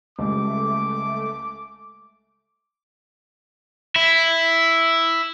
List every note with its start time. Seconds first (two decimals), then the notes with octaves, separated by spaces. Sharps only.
0.19 C#2 G3 A3 D6
3.96 E4